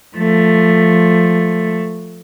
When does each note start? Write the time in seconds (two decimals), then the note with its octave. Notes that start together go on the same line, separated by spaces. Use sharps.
0.17 F3 A3